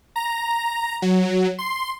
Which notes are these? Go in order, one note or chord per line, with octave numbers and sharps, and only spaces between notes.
A#5
F#3
C6